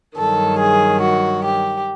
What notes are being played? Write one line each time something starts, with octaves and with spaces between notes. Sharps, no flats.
G2 D#3 F#3 A4
G#4
F#4
G4